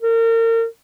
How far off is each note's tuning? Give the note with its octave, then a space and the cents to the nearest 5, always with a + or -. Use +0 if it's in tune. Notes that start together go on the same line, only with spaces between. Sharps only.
A#4 -35